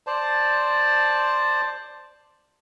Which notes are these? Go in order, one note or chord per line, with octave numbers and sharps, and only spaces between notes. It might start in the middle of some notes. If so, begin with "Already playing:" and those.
C5 D5 A5